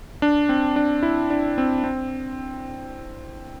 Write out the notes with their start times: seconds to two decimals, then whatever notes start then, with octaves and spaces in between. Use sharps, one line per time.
0.22 D4
0.49 C4
0.76 D4
1.03 E4
1.30 D4
1.58 C4
1.84 C4